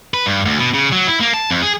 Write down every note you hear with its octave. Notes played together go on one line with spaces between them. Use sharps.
B4
G2
D2
B2
C#3
F#3
E4
A#3
A5
F2
G#4